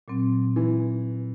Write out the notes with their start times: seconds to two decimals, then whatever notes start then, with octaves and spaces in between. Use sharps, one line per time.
0.08 A#2 F#3 C4
0.56 E3